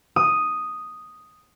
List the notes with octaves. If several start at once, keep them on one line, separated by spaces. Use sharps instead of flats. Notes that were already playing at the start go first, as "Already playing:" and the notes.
D#6